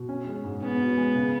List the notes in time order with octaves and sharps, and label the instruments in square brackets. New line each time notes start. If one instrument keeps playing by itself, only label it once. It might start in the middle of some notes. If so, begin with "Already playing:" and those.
Already playing: [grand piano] B2
C#4
G#3
G#2
[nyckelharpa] B3 [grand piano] C#4
[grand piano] F#4
G#3
C#3